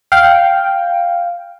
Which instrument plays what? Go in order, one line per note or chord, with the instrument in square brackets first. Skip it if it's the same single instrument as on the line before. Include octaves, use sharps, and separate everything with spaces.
[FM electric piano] F5 [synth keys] G5